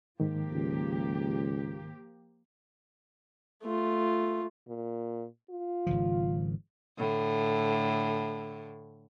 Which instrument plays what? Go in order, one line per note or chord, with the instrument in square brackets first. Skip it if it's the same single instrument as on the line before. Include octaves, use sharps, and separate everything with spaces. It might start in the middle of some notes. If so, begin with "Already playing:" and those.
[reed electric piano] G#2 D#3 [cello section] F3 A#3 G4
[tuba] C#2
[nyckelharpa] A3 F4
[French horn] A#2
F4
[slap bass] G#1 C#3 F3
[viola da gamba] A2 D3